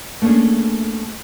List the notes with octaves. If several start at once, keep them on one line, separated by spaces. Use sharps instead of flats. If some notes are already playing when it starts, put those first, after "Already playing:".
A3 A#3 C#4 D4 G#4